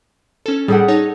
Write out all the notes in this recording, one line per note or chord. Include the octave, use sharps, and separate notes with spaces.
C#4 A4
A2 G3 G#4 A4 F#5
D#4 C#5 A5